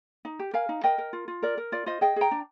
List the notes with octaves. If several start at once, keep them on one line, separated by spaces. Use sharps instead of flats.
D#4
G4
A#4 F5 G#5
D#4
A#4 D#5 G5
A#4
F4
F4
A#4 D5
A#4
F4 D5
F4 C5 D#5
G#4 D#5 G5
G#4 G5 A#5
D4